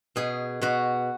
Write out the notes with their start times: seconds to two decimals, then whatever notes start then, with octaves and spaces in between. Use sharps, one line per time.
0.16 B2 G#4
0.62 B2 F#4